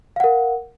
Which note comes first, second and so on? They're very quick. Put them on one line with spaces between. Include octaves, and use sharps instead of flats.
F5 F#5 A#4